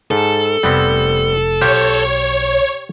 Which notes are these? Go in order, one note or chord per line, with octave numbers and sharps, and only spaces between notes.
G#2 A4
F1 G3 B3 C4
B1 G4 C5 C#5 F5